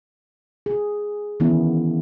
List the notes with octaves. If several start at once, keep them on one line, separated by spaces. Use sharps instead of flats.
G#4
D#3 E3 A#3 B3 C#4 E4